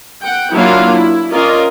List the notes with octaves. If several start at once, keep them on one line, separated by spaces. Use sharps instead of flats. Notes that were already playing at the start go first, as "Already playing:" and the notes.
F#5 G5
F#3 A#3 D4 E4 F4 F5
E4
C#4 F4 A#4 D5 D#5